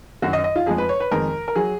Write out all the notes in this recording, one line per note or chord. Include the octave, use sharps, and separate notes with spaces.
F#2 D#3 F#3 F#4
D#5
D#5
F4
F2 F3 G#3 G#4
B4
C#5
B4
F2 D#3 G#3 A#4
A#4
F#3 G#4